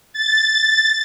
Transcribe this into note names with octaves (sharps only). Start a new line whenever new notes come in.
A6